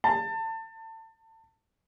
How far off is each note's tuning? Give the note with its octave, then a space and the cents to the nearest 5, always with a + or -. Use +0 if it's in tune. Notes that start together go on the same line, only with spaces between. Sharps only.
A5 +30